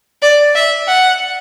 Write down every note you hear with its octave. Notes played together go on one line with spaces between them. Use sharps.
D5
E5
F#5